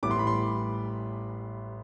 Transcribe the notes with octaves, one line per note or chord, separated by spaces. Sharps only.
A1 A2 E3 G3 B3 D6
C6
B5
C6